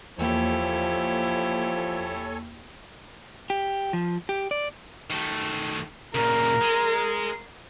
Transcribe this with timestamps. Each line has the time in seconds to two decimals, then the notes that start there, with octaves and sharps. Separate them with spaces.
0.19 E2 F3 A#3 E4 G4 A4 C#5 G#5
3.50 G4
3.93 F3
4.29 G4
4.51 D5
5.10 D#3 A3
6.15 A#2 C#3 A#4
6.61 G#3